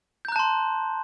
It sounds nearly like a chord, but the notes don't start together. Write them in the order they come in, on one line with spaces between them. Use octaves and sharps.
G6 A#5 F#6 A5 C6